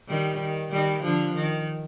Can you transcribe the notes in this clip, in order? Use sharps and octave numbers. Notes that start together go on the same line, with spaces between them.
D#3 G3
D#3
D#3 G3
D3 F3
D#3